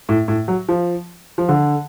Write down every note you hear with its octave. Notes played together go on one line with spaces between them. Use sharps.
A2
A2
F#3
F3
F3
D3